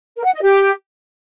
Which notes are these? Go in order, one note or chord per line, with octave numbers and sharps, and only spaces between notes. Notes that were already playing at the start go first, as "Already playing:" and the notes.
A#4
F#5
D#5
G4